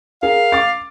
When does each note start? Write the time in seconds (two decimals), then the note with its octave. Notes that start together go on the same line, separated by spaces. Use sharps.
0.23 G#4 A#4 F5
0.52 D6 A6